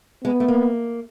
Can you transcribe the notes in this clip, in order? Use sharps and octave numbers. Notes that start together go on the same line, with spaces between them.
G#3 B3
A3
A#3